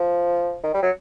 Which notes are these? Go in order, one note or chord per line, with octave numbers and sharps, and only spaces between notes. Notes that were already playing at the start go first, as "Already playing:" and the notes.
Already playing: F3
D#3
G3
F#3